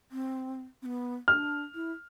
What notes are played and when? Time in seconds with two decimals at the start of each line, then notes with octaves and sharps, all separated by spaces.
0.12 C4
0.82 C4
0.86 B3
1.28 D4 F6
1.75 E4